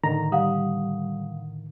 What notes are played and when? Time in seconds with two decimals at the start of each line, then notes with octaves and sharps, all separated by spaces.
0.04 A2 D3 D#3 A#5
0.32 G3 F5 F#5 D#6